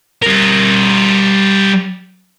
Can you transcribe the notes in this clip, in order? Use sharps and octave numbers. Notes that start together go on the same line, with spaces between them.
G3 A#4